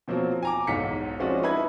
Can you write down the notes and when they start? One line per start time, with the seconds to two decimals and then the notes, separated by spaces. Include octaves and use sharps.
0.08 B2 F3 F#3 A#3 C4
0.43 G#5 A#5 D6
0.67 B1 E2 G#2 F5 B6 C#7
1.20 F3 G#3 C4 C#4 F#4 D5
1.43 D#4 E4 B4 B5 G#6